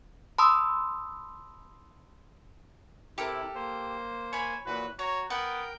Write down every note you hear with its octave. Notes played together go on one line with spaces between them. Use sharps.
A5 B5 C6 D#6 E6
C3 E4 G4 A4 A#4
A#3 C5
C#5 G#5 B5
A#2 E3 F#4 B4
F#4 C#5 A#5
B3 A#4 F#5 G5 G6